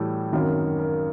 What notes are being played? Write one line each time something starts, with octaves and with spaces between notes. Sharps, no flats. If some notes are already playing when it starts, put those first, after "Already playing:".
Already playing: A2 E3 G3 A4
G#1 F#2 D#3 F#3 A#4
A#4